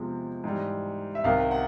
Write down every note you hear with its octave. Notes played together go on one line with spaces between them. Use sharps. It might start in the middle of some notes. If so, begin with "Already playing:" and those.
Already playing: E2 C3 F3 G#3
G#2 E3 G3
E5
C2 C3 D#3 F5
F#5